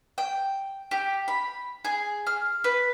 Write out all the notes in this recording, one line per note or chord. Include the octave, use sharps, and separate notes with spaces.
G5
G4
B5
G#4
F6
B4